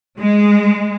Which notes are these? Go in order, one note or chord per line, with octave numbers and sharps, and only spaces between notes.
G#3